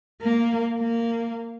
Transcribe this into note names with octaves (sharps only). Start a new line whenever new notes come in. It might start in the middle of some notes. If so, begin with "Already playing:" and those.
A#3
A#3